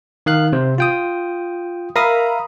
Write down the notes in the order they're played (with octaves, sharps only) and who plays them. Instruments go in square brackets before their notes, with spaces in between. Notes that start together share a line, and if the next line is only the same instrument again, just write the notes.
[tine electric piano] D#3 F5 F#6
C3 C5
F4 G5 D#6
[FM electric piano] A#4 A#5 B5 [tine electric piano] E5 F5 D#6